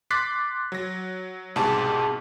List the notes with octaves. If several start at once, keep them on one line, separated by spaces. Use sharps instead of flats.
C6 D6 F#6 A6 B6 C7
F#3 A#6
C2 G#2 B2 G4 G#4 A5